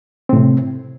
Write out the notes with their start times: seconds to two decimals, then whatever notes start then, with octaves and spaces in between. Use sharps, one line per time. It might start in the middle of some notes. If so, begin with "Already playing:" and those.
0.29 C4
0.33 A2
0.36 C3